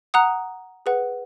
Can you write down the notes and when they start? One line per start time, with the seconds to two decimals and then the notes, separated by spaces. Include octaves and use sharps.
0.14 F#5 A#5 D#6 F#6
0.86 G#4 B4 F#5